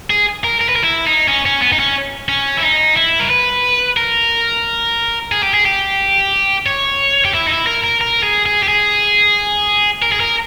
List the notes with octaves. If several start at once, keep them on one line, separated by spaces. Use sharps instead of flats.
G#4
A#4
A#4
B4
A#4
E4
D#4
C#4
C#4
B3
D#4
C#4
C#4
E4
D#4
E4
A#4
B4
A#4
G#4
G4
G#4
G4
C#5
G4
E4
D#4
E4
A#4
A#4
A#4
G#4
G#4
G4
G#4
A#4
G#4
A#4